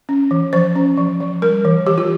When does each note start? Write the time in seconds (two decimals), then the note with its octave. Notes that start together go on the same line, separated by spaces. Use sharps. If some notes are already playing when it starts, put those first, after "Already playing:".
0.09 C#4
0.31 E3
0.53 F3 C5
0.75 C#4
0.97 F3
1.20 F3
1.42 G3 A#4
1.65 E3
1.86 E3 G4
1.98 F4